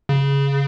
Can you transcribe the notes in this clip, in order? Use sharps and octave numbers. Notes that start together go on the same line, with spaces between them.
C#3